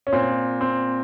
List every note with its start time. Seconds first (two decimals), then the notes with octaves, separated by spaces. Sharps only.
0.07 C#4
0.12 A#2 C4
0.61 C4